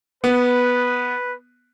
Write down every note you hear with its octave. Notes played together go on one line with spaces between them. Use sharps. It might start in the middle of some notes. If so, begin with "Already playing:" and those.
B3 B4